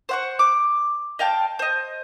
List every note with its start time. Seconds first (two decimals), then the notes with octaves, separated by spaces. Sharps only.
0.09 C5 F#5 C#6
0.39 D6
1.19 D#5 F5 G5 A5
1.59 C5 D#5